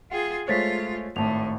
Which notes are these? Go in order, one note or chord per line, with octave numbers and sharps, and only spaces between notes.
F4 G#4 F#5 G5
G#3 A3 F4 C5 C#5 A6 B6
G#1 A2 A5 F7